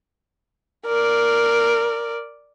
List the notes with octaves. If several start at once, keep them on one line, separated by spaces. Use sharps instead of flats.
A#4 D5